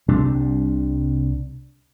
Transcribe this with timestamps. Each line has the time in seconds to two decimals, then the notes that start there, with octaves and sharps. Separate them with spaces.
0.08 C2 C3 G3 D4